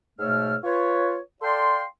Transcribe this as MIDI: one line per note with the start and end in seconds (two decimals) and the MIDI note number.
0.19 0.55 44
0.19 0.55 47
0.19 0.55 57
0.19 0.55 73
0.19 0.55 88
0.19 0.55 89
0.63 1.17 65
0.63 1.17 71
0.63 1.17 73
1.42 1.82 69
1.42 1.82 74
1.42 1.82 77
1.42 1.82 79
1.42 1.82 84